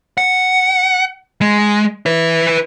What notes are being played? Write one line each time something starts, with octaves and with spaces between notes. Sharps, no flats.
F#5
G#3
E4 B4